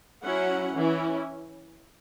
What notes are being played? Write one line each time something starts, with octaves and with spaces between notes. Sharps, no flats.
F#3 C#4 E4 F#5
E3 C#4 E4